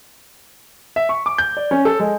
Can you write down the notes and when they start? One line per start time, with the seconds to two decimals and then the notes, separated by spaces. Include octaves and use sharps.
0.96 E5
1.09 C#6
1.26 D6
1.38 G6
1.57 D5
1.71 C#4
1.85 A4
2.00 G#3